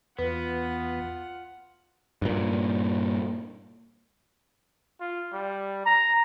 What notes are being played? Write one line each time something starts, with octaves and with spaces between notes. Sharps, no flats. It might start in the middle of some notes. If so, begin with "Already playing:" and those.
E2 B3 F4 B4 F#5
G2 A#2
F4
G3
A#5